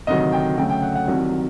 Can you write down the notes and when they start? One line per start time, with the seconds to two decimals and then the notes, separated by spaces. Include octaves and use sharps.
0.07 D2 C3 D#3 F#3 D#5
0.32 G5
0.57 D2 C#3 F#3 A3 G5
0.69 G5
0.83 F#5
0.96 F#5
1.07 C2 C3 D#3 F#3